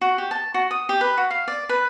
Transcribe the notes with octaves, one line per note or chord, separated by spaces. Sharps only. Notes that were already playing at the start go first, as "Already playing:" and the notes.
F#4
G4
A5
F#4
D#6
G4
B4
F#4
F5
D5
B4